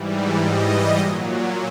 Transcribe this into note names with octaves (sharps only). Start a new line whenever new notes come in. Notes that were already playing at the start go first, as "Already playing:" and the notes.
Already playing: G#2 E3 G3
D#5
A#2 F#3